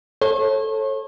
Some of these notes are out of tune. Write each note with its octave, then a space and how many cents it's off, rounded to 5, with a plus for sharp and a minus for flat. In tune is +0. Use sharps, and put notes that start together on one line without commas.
A4 +0 C#5 -35